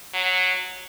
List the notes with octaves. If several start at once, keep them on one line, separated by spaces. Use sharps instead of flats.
F#3